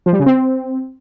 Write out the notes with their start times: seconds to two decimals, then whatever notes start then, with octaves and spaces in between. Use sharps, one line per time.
0.06 F3
0.13 G3
0.20 C#3
0.26 C4